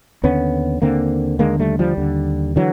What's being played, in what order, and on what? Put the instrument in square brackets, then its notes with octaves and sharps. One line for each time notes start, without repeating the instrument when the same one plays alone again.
[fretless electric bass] D#2 D3 B3 C#4
D#2 D3 A#3 C4
D#2 D3 G#3 A#3
G3 A3
F3 G3
D#2 D3
D3 E3 F#3